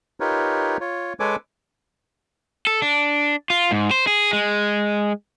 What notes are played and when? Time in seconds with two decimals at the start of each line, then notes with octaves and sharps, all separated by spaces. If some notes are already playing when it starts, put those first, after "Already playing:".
0.20 D#4 F4 G4 A#4 B4 C#5
0.81 F4 C#5
1.20 G#3 A4 B4 C#5 G#5 D6
2.67 A4
2.82 D4
3.50 F4
3.71 G#2
3.91 C5
4.07 G#4
4.33 G#3